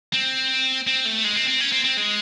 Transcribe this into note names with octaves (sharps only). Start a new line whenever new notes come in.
C4
C4
A3
G#3
C4
C4
C#4
C4
C4
G#3